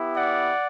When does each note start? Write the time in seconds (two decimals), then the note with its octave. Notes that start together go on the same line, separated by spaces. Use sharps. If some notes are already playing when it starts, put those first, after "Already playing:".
Already playing: B3 E4 G4
0.15 D5 F#5